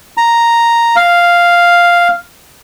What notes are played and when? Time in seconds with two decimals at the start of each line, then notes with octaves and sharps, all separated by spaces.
0.17 A#5
0.96 F5